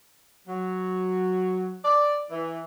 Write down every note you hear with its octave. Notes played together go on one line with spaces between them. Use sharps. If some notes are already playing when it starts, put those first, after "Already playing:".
F#3
D5
E3